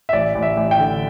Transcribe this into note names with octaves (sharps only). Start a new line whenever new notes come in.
E5
A1 D5
A1
E5
A1
G5
D3